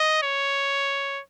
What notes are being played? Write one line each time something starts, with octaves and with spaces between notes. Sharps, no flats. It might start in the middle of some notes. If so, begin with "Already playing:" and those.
Already playing: D#5
C#5